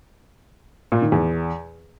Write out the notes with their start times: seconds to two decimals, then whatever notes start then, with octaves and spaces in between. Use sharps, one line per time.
0.92 A#2
1.02 D#3
1.12 E2